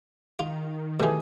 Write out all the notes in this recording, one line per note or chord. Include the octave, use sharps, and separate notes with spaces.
D#3 F4
B2 E3 A3 G4 G#4